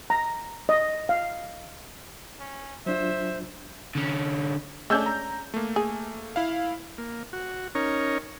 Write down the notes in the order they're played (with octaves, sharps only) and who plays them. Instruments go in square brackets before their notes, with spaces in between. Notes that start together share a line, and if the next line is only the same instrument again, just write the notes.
[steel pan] A#5
D#5
F5
[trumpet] C#4
[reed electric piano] F#3 D4 F4 [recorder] C5 [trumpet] E5
[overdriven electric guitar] D3 C#4
[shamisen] G#3 C#4 D4 [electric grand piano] A3 E6 G6
[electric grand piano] A#5
A3 A#3
[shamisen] G#4
[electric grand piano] E4 F5
[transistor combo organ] A#3
F#4
C#4 D#4 A#4 C#5